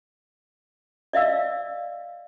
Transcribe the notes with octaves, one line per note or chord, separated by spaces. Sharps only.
D5 D#5 F5 E6